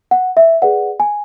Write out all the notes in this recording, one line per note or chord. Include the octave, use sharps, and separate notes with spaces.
F#5
E5
G#4 B4 D5 F#5
G#5